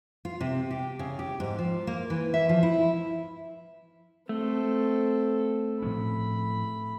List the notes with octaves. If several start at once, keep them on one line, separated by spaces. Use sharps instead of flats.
F4
C3
G4
C#3
G4
G#2
F3
A#3
E3
E5
F3
E4
A3 C4 A4
A2 F3 C#4 B5